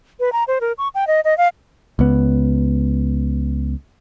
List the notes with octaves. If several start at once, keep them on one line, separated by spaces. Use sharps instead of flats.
B4
A#5
C5
A#4
C#6
G5
D#5
D#5
F5
C#2 B3